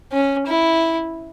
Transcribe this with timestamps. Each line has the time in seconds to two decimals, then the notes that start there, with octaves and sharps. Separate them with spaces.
0.12 C#4
0.47 E4